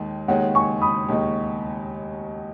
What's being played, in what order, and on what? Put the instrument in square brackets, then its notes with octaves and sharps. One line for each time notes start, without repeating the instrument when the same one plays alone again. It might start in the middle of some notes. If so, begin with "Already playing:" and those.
Already playing: [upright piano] D#2 D#3 G#3
[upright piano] D#2 D#3 G#3 D#4 [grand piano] C#5 F#5
[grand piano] G#5 C#6
B5 D#6
[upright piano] D#2 D#3 G#3 D#4